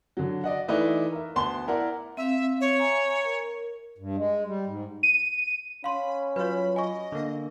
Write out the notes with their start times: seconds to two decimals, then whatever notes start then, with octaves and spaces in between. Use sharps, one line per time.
0.17 D3 F#3
0.44 D5 D#5 F#5
0.68 E3 A3 D#4 E4 B4 D5
1.12 A#4 E5
1.35 D2 B3 A5 C6 G7
1.67 E4 A#4 D5 F#5
2.17 C4 E5 F5
2.61 C#5
2.79 E5 G#5 A#5
3.24 A#4
3.98 G2
4.16 G#3
4.46 G3
4.65 G#2
5.03 D#7
5.84 C#4 F5 B5 C6
6.36 F#3 F4 B4 C#5 B5
6.76 D#5 G#5 C#6
7.12 D3 A#3